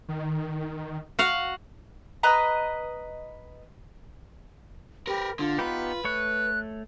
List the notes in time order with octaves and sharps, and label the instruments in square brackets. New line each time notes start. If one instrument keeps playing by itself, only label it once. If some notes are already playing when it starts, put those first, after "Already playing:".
[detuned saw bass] D#3
[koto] F#4 F5 F#5
[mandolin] B4 D#5 A#5
[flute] G4 [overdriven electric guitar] A#4 B4
[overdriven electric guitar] D3 [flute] F4
[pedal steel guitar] B3 D#4 G4 [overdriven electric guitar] B4
[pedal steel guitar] A3 C#5 C#6 [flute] F#6